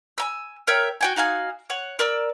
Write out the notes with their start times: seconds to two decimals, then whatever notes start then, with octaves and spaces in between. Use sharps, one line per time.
0.18 G#5 A#5 E6
0.67 A#4 C#5 E5 G5
1.01 F#4 G5 G#5
1.16 D#4 F#4 F5 G#5
1.70 C#5 F#5
1.99 A#4 D5 E6